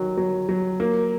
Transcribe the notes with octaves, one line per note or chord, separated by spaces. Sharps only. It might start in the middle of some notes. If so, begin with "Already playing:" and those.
Already playing: D#3 F#3
F#3
F#3
A#3